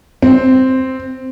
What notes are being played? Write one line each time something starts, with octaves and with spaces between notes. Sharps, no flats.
C4